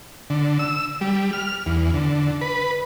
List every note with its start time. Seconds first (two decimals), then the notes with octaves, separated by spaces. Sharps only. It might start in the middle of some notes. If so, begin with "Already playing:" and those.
0.30 D3
0.59 E6
1.01 G3
1.33 F6
1.66 E2
1.94 D3
2.41 B4